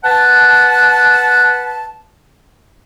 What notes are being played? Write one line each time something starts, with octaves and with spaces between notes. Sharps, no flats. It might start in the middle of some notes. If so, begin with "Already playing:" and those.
B4 F#5 A5